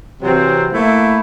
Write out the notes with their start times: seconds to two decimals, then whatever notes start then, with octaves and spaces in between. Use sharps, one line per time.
0.22 C3 E3 F#3 C4
0.73 A3 A#3 E4